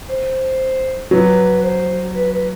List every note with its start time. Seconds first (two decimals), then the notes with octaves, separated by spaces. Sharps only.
0.09 C5
1.11 F#3 B4
1.62 C5
2.15 B4
2.31 B4